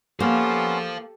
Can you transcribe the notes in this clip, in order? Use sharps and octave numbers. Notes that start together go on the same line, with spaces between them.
A#3 B3 C#4 G4 A4 C5 F5 C6